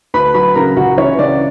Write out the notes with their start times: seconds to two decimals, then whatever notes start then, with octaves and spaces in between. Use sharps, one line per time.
0.14 D2 B4 B5
0.34 F#3 B4 B5
0.55 C#3 A#4 A#5
0.76 C#2 F#4 F#5
0.97 E3 C#4 C#5
1.19 C#3 D4 D5